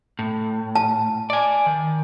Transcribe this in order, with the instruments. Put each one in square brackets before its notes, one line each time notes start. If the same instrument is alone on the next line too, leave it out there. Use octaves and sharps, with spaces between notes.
[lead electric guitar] A2
[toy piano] A5
[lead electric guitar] D5 G#5
D#3